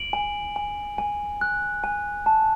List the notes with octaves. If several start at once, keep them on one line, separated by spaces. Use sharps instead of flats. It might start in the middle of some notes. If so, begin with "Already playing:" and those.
Already playing: D7 F#7
G#5
G#5
G#5
F#6
G#5
A5